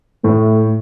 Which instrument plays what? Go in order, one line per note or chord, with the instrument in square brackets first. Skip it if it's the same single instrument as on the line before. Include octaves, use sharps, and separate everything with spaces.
[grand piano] A2 [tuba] A3